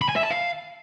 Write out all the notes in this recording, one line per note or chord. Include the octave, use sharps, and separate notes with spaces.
B5
G#5
E5
A5
F5